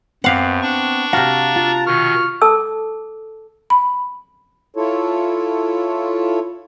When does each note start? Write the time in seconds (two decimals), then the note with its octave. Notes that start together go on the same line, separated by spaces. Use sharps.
0.24 F#2 B3 C4 G4 F5 F#5
0.62 D4 C#6
1.13 C3 F#4 F5 A5 A#5
1.56 F4
1.86 B2 D#3 C#6 F6
2.42 A4 A5 D6 E6
3.70 B5
4.76 E4 F4 A4 C#5